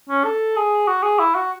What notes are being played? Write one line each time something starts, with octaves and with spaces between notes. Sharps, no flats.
C#4
A4
G#4
F#4
G#4
E4
F#4